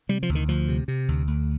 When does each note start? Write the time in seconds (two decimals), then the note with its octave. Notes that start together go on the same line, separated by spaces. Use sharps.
0.09 C3 G3
0.23 F3
0.29 D2
0.35 D#3
0.48 D2 F3
0.68 C3
0.88 C3
1.08 D2
1.28 D2